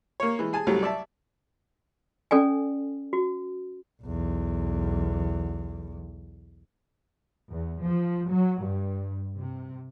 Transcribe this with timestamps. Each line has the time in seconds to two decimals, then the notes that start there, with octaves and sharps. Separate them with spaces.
0.20 A#3 C#5
0.39 E3 G#3
0.53 G#4 G#5 A5
0.67 C2 F#2 C3 F#3 A3
0.83 D5 E5 A5
2.31 C#4 A4 D5 G#5
3.13 F#4
4.02 B1 E2
7.51 E2
7.82 F3
8.29 F#3
8.64 G2
9.37 C3